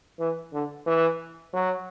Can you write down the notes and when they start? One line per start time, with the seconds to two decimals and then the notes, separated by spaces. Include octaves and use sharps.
0.19 E3
0.53 D3
0.86 E3
1.53 F#3